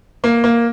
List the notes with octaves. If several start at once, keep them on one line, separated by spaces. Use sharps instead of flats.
A#3
A#3